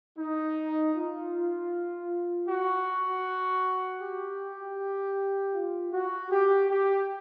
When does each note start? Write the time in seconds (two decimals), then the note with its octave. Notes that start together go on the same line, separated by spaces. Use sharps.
0.18 D#4
0.94 F4
2.48 F#4
4.00 G4
5.54 F4
5.92 F#4
6.30 G4
6.70 G4